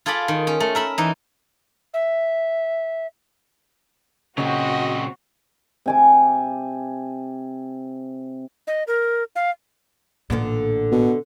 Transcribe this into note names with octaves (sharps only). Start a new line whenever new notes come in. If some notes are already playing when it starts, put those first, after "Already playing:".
F4 G#4 A4 D5 B5
D#3
C#4
A3
A#4 E5 B5
E3 D#4
E5
A#2 C#3 F#3 C4 F#4 D#5
C3 G#5 D6
D#5
A#4
F5
A1 A#2 D3 B3 D4
B2